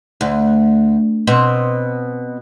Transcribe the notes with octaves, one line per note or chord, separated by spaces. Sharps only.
D2
B2 C4